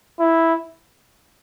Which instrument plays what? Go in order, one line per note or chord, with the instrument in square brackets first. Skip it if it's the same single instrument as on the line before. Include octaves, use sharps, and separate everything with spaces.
[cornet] E4